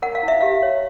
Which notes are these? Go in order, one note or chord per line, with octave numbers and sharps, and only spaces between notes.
A#4 F#5
F5
E4
E5
G4 F5
C#5